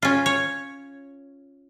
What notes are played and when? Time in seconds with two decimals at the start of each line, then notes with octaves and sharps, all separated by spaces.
0.02 C#4 F4
0.26 C#5